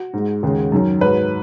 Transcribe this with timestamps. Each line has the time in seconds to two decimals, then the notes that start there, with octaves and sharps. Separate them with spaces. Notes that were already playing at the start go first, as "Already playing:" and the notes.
Already playing: F#4
0.13 G#2 G#3
0.43 D#2 C#3 G#3
0.72 F#2 D#3 F#3
1.01 G#2 F#3 B4